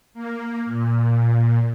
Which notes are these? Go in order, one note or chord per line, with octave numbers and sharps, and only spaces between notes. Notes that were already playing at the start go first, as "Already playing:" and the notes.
A#3
A#2